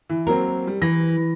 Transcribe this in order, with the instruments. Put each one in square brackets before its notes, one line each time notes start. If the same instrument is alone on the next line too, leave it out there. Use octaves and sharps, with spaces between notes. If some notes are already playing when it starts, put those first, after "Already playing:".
[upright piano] E3
[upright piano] F#3 A#3 C4 [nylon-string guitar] A#4
[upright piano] G3
[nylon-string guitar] E3 [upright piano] A#6